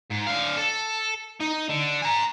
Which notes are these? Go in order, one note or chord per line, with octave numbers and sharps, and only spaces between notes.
G#2
D3 F5
A4
D#4
D3
G#5 A#5